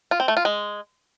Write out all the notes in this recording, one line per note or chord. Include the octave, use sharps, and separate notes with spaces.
F4
C4
A3
F4
G#3